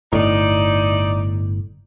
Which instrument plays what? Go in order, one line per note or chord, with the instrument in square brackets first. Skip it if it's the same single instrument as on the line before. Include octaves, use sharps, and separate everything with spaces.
[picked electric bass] G1 A2 [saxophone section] D#4 D5